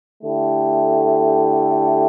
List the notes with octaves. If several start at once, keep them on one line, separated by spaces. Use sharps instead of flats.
D3 A3 E4 G4